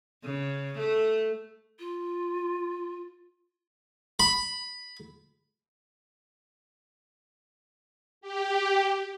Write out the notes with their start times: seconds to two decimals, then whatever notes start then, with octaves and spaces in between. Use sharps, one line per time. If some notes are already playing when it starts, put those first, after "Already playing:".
0.24 C#3
0.79 A3
1.80 F4
4.20 B5
8.21 G4